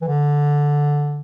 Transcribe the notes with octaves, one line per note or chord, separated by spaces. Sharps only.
E3
D3